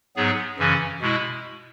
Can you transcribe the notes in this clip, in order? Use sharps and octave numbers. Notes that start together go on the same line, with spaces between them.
G#2 F#3 B3 G#4
F#2 C#3 E3 C#4
B2 G#3 E4